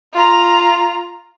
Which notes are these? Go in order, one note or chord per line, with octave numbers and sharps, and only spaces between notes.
F4 A#5